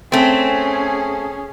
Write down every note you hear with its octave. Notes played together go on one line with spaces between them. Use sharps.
A3 C4 C#4 G#4